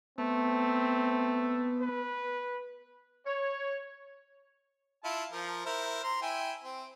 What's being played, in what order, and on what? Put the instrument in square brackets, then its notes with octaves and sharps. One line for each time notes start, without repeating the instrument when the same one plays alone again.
[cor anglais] A3 [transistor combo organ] B3 [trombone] C4
[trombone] B4
[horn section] C#5
[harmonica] E4 F4 A5
F3 A#4
E4 A#4 C5
A#5 C6
E4 G5 G#5
C4